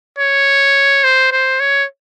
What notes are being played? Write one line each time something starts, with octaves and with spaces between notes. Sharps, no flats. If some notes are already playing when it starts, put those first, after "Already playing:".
C#5
C5
C5
C#5